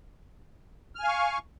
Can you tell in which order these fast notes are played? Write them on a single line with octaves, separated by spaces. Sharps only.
F6 G#5 F5 C#6